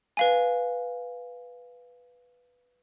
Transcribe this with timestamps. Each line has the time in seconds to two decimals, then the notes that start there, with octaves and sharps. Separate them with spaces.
0.17 B4 F5 G#5